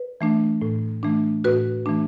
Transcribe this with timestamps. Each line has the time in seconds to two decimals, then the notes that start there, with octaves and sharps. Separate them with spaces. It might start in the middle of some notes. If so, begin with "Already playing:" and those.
Already playing: B4
0.21 E3 A3 D4
0.62 A2
1.03 E3 A3 D4
1.44 A2 F#4 B4
1.86 E3 A3 D4